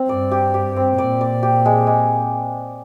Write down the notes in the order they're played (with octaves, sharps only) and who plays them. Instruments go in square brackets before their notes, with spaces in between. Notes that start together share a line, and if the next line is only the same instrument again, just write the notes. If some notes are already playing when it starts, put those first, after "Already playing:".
Already playing: [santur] C4
[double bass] G2 [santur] D5
[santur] G4
G4
C4
[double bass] A#2 [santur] D5
[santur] D5
G4
G#3
G#3